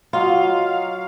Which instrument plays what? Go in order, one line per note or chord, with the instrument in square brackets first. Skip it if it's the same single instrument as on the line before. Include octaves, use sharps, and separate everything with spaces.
[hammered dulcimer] F#3 D#5 [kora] F4 [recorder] F5